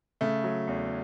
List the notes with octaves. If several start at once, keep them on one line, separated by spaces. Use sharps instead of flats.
C#3 A3
F#3
E2